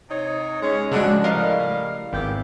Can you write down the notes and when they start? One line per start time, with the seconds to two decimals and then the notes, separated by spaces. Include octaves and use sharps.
0.10 C3 D#4 C#5
0.62 G#3 C#4
0.92 C#3 F3 G#3 D4 F#4
1.24 A2 G3 A#4 D#5 F5
2.13 G#1 B3 E4 G4